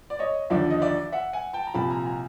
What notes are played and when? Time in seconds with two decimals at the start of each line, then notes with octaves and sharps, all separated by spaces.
0.10 D5
0.19 C#5 D#5
0.50 D#2 D3 F3 D5 E5
0.71 D#5
0.81 D5 E5
1.12 E5 F#5
1.33 F#5 G#5
1.53 G5 A5
1.67 A#5
1.74 C2 A#2 F3 A5 B5
1.90 G#5 A#5
2.06 G#5 A#5